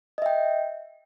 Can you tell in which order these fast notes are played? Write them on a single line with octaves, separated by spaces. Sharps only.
D#5 E5 G5